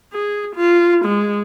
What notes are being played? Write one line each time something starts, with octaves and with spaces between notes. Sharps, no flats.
G#4
F4
G#3